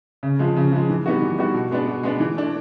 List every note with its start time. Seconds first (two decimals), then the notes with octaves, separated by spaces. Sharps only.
0.23 C#3
0.39 F3 G#3
0.57 C#3
0.72 F3 G#3
0.90 E3
1.06 G3 B3 D#4 F#4
1.22 E3
1.38 G3 B3 D#4 F#4
1.54 B2
1.71 G#3 B3 D4
1.88 B2
2.03 G#3 B3 D4
2.20 E3
2.37 A3 D4